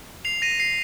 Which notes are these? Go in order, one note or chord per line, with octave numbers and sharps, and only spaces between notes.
C7 F7
A#6 D#7
C7